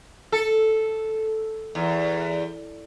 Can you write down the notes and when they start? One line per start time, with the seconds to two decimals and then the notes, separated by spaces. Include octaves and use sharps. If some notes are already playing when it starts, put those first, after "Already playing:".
0.32 A4
1.75 E2